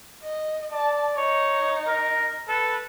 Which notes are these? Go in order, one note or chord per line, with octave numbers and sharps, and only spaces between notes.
D#5
D5 A5
D#4 C#5
A#4
A4 B4